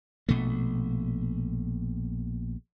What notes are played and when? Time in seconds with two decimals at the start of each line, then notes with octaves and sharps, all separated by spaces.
0.29 A#1 B2 A3